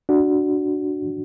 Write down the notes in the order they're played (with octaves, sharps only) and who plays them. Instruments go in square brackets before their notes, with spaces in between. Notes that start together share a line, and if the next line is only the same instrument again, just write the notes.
[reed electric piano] D4 F#4